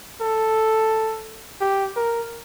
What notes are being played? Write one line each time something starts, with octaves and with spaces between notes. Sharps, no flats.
A4
G4
A#4